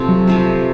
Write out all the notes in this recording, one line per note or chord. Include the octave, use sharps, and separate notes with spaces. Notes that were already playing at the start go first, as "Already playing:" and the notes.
Already playing: C3 F3 A3 C4
F#3
C3 F3 A3 C4